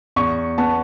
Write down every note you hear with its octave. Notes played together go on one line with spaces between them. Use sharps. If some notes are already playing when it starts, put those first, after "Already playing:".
E2 C#6
B3 A5